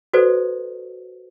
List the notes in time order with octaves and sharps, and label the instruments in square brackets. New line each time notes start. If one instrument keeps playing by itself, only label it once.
[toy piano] F#4 A4 B4 C5 D5